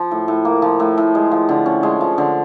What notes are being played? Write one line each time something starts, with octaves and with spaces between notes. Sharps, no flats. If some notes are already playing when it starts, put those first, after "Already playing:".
Already playing: F3
A2
A2
A#3
F3
A2
A2
G#3
F3
D3
C#4
G#3
F3
D3